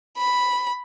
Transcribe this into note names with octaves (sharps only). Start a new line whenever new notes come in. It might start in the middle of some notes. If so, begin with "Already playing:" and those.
B5